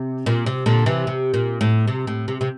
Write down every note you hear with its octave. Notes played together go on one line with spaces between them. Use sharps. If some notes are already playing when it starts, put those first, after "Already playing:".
Already playing: C3
A#2
C3
A#2 D3
C3 E3
C3
A#2
A2
C3
A2
C3
C3